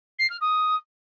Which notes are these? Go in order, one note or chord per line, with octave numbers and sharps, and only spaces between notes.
C7
F6
D#6